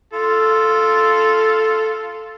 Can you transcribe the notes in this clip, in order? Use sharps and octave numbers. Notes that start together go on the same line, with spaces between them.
F4 A4